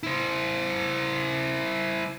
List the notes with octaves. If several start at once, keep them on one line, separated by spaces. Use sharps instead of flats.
E4 C5